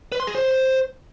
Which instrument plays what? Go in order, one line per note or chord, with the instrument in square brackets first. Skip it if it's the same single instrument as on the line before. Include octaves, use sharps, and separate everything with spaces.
[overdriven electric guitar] B4
C6
G#4
C5